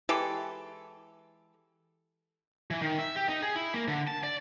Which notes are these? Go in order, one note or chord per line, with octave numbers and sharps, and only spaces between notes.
E3 G#3 G4 A4
E3
D#3
E5
G4
D#4
G#4
E4
A#3
D3
A5
D5